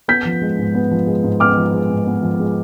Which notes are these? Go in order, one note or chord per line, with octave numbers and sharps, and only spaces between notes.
B3 G6 B6
F3
G#3
G#2
B3
F3
G#3
G#2
B3 D6 F6
F3
G#3
G#2
B3
F3
G#3